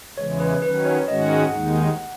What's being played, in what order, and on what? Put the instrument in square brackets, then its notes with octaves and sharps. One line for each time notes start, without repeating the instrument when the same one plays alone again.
[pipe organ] E2 C#3 E3 G#3 [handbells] C#5
[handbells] B4
[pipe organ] D#3 F#3 C#4 [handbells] B4
[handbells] C#5
[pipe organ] G#2 D#3 G#3 C#4 F#4 [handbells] D#5
[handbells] F#5
[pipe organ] D#2 D#3 G#3 D#4